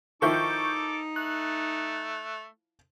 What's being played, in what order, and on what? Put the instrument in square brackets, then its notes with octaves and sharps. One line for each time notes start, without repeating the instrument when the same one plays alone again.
[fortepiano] D#3 F3 E4 [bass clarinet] D#4 [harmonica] A4 D6 [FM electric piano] C#6 G6
[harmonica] A3 [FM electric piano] F#6